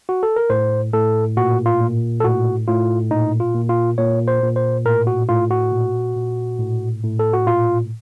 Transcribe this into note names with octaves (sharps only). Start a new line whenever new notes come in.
F#4
A4
A#4
A2 C5
A2 A4
A#2 F#4
F4
A#2
A4
A2 F#4
A2 F4
A#2 D#4
F4
A#2
F4
A#2 C#5
C5
A#2
C5
A2 A#4
F#4
A2 F4
F#4
A#2
A#2
A2
A2
A4
F#4
A#2 F4